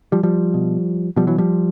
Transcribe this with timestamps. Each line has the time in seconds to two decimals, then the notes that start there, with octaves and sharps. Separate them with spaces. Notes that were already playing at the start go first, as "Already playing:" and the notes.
0.12 F3 G3
0.23 F3 G3
0.54 B2
1.16 B2 F3 G3
1.27 E3 F#3
1.38 F3 G3